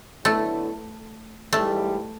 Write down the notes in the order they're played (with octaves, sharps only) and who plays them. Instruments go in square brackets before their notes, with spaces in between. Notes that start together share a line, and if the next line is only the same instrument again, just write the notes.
[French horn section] D3 F#3 B3 E4 [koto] A3
[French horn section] G#2 E3 G3 [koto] A3